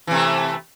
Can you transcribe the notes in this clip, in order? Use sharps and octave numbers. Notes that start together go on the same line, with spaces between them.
C3 E3 A3